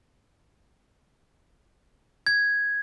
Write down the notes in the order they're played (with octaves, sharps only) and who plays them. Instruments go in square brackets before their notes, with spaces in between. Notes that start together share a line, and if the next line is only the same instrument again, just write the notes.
[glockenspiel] G#6